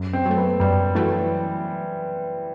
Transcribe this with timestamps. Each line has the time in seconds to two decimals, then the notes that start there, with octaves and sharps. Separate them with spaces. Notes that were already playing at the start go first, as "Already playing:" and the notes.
Already playing: F#2
0.13 C4
0.25 F#3 A3
0.37 B3
0.60 F#2 G3
0.95 E3 F#3 A3